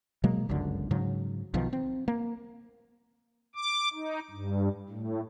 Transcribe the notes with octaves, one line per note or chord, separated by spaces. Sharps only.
B2 F#3 G#3 A#3
G1 C#2 F#2 D3
G#2 C#3 F#3
B1 B2 D#3 F3
C4
A#3
D6
D#4
G2
A2